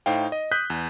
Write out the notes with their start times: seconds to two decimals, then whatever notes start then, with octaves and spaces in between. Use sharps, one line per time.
0.06 A2 D#4 C5 F5 G5
0.32 D#5
0.51 D#6 F#6 G6 B6
0.70 E2